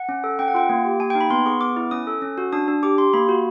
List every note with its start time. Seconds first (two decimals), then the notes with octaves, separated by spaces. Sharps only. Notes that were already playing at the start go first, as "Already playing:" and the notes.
Already playing: F#5
0.09 C#4
0.24 A4
0.39 C#4 G5
0.48 F#5
0.54 F4 G5
0.69 A#3
0.85 G4
1.00 A#3 G#5
1.10 D#4 G5
1.21 B5
1.30 B3 C6
1.46 G#4 C#6
1.61 B3 D6
1.76 E4
1.91 C#4 D#6
2.07 A4
2.22 C#4
2.38 F#4
2.53 D4 D#6
2.68 D4
2.83 G4 D6
2.98 G4 C6
3.14 A#3 B5
3.29 F#4